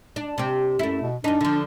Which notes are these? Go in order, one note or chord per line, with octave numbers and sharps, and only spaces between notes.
D4
C3 C4 G4
F#2 A3 E4
B2
F#2 D4 D#4
D3 F3